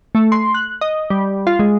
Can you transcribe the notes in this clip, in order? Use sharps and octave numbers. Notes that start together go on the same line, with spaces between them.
A3
C6
F#6
D#5
G3
F4
G#3